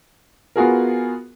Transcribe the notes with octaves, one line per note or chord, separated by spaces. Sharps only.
B3 F4 F#4 G#4 A#4